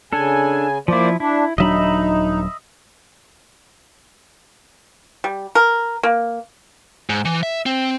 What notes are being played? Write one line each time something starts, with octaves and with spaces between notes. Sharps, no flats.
C#3 D4 A4 G#5
F3 A#3 E4 C5 D5
D4 E4
D#1 F#3 D4 D#4 D#5 E5 B5
G3
A#4
A#3
G#2
E3
E5
C4